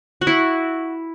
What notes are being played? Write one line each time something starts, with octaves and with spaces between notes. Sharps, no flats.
F#4
E4